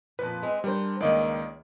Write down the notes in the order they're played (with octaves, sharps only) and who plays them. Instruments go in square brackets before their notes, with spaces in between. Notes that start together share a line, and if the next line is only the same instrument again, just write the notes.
[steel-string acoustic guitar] F2 A#2 F3 [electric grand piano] B4
[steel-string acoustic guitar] G#3 C4
[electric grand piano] G3 [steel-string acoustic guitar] D4 A#4 C5
[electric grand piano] C#2 D#3 A#3 [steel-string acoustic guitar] D5 D#5